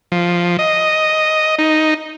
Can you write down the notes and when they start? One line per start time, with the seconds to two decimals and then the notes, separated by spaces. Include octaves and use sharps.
0.12 F3
0.59 D#5
1.59 D#4